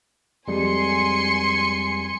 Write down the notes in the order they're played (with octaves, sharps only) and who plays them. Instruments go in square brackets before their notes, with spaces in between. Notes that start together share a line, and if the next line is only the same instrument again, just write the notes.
[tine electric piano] F2 G3 G#3 [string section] G#5 C6 C#7